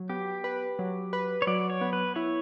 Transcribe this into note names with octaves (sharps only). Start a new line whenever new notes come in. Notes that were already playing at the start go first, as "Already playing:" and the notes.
Already playing: F#3
B3 G4
B4
F#3
B4
C#5
F#3 D5
C#5
B3
B4
E4 C#5